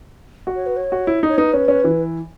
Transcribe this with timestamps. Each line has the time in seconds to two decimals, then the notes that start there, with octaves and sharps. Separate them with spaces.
0.47 F#4
0.56 C#5
0.66 B4
0.76 C#5
0.92 F#4
1.07 E4
1.23 D#4
1.29 C#5
1.38 D#4 B4
1.54 C#4
1.68 C#4
1.84 E3